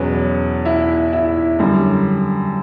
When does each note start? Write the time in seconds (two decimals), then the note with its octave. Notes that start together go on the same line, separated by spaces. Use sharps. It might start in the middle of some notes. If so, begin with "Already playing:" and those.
Already playing: E2 B2 F#3 B3 C#4 B4
0.65 E4 E5
1.13 E4 E5
1.59 F#2 D3 G3